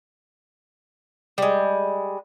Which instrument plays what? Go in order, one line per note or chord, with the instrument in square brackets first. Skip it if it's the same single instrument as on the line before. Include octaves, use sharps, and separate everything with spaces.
[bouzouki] G3 G#3